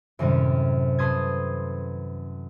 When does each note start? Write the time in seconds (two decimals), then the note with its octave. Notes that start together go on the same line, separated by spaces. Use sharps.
0.19 F#2 A2 C3 D#3 G3 C#4
0.99 A4 B4 C6 D#6 G#6